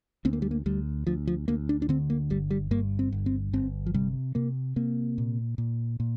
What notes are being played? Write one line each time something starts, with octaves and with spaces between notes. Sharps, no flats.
D2 C4
A#3
G3
A#3
D2 G3
D2 F3
F3
D2 A#3
D4
D4
D3 C4
A#3
G1 G3
G3
G2 A#3
C4
G1
C4
G1 C4
F3
C3 G3
C3 A#3
C3 A#3
A#2
A#2
A#2